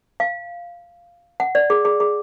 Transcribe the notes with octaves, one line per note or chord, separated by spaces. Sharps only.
F5
F#5
D5
G#4
G#4
G#4